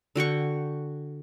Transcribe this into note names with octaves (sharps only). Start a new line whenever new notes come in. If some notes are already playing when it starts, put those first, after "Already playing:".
D3 F#4 G5 C#6